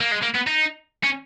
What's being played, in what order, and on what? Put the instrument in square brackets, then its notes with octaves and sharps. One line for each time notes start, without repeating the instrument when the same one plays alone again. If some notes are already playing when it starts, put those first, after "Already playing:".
[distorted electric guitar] A#3
G#3
A#3
B3
D#4
C#4